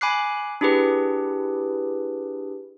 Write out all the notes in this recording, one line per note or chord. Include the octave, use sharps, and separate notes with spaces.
G#5 B5 D6 F#6 C7
D4 E4 G4 G#4 B4